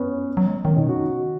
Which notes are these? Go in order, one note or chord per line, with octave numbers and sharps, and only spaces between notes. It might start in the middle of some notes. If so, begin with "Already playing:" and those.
Already playing: B3 C#4
F#3
G#3
F#3
D#3 C#4
B2 D#4
C#3 F#4
D#3